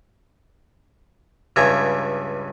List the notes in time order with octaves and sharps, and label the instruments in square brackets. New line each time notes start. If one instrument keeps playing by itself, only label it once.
[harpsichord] C#2 G2 C#3 E5 G#5 A#5